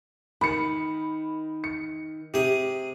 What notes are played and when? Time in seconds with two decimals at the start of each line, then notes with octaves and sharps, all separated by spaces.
0.41 D#3 B5 C#7
1.64 C#7
2.34 C3 G4 G#4